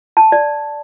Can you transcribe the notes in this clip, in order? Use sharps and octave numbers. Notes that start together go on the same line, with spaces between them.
A5
D5